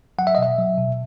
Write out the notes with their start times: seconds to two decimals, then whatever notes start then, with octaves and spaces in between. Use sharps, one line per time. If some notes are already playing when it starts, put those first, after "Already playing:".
0.18 F#3 F#5
0.27 E5
0.35 D#5
0.38 B2 E5
0.58 F#3
0.77 B2